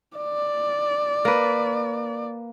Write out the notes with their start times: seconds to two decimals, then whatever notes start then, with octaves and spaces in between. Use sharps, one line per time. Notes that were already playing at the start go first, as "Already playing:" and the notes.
0.17 D5
1.25 A#3 B4